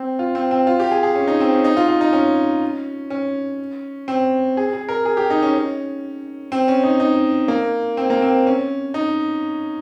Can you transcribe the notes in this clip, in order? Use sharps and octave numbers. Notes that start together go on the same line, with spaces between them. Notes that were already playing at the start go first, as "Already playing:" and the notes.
Already playing: C4
F4
C4
C4
F4
G4
G#4
G#4
C#4
D#4
C4
C#4
D#4
F4
F4
D#4
C#4
C#4
C4
G#4
G#4
A#4
G#4
G4
D#4
C#4
C#4
C4
C#4
D#4
D#4
A#3
C4
A#3
C4
C#4
D#4